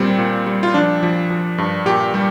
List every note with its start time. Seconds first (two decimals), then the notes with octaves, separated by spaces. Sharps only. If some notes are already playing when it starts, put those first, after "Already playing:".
Already playing: A#2 G3 C4
0.18 A#2
0.46 G3
0.63 F4
0.74 F3 D4
1.03 F3
1.30 F3
1.58 G2
1.86 A#2 G4
2.14 G3